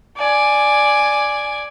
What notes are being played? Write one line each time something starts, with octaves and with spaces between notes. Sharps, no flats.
D5 G#5